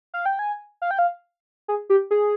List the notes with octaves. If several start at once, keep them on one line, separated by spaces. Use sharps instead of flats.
F5
G5
G#5
F5
G5
F5
G#4
G4
G#4